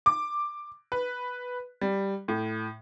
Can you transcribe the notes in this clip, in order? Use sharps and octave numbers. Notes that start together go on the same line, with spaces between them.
D6
B4
G3
A2